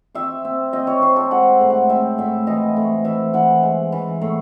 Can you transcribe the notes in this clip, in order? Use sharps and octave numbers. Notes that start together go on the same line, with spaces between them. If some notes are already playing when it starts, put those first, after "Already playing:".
C4 E5
C4
C4 D#5
C#5
C4 C5
A4
G#3 F#5
A2
F#5
C4 E5
A2 E5
E3 D#5
A2
E3 E5
E3 F#5
G#3
E3
A2